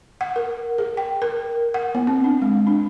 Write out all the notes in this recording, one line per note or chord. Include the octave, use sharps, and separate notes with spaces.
F#5
A#4
G#4
G5
A#4
F#5
B3
C4
D4
G#3
D4